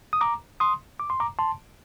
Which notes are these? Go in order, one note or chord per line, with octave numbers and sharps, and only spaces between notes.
D#6
A#5 D6
C6 D#6
D6
C6
A#5 D6
A5 C6